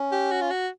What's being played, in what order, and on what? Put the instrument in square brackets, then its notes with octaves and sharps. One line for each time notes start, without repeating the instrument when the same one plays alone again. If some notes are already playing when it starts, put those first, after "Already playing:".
Already playing: [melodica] C#4
[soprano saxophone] G4
F#4
F4
F#4